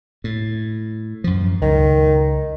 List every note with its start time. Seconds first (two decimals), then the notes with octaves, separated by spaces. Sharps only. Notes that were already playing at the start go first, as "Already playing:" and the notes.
0.24 A2
1.24 F#2 F3
1.62 C#2 D#3